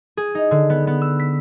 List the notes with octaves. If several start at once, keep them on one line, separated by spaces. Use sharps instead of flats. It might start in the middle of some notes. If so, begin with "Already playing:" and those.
G#4
D#4
D3
B3
B3
E6
B6